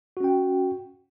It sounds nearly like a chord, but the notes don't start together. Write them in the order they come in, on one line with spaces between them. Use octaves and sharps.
F#4 C#4 G5